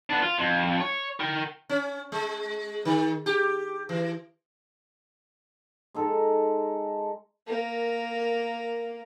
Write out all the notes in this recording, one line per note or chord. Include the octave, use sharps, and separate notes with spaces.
B3 D4
F4
F2
C#5
A#4 G5
C#4
G#3
D#3
G4
E3
G#3 D#4 A4
A#3 A#4